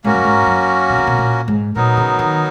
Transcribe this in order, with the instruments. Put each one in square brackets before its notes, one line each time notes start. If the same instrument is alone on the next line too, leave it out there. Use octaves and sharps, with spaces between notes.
[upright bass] G#2 [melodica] A#3 C#4 F#4 A#4
[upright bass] F#2
G#2
F#2
B2
C#3
B2
A#2
G#2
[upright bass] A#2 [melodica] F#3 B3 D#4 A#4
[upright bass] C#3
D#3